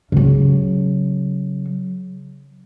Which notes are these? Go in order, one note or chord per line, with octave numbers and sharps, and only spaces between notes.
C#3 F#3